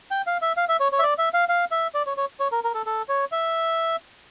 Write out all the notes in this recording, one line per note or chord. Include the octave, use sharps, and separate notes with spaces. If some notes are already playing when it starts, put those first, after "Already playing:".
G5
F5
E5
F5
E5
C#5
C#5
E5
D5
E5
F5
F5
E5
D5
C#5
C#5
C#5
A#4
A#4
A4
A4
C#5
E5